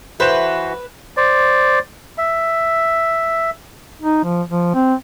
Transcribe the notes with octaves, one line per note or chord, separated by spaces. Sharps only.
E3 F#4 B4 C5 E5 G6 E7
C5 D5
E5
D#4
F3
F3
C4